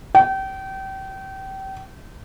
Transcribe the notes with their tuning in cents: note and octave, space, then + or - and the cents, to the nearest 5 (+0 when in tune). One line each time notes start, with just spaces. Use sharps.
G5 -30